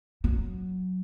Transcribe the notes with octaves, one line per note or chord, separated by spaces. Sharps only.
F#3